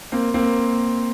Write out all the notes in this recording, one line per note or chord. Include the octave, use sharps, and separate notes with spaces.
A#3 C4
A#3 C4